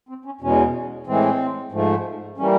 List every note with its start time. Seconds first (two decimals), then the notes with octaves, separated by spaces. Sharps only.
0.09 C4
0.25 C#4
0.41 E2 B2 G#3 C#4
1.07 A2 E3 G#3 C4
1.72 G#2 F3 A3
2.37 E3 G3 A#3 C#4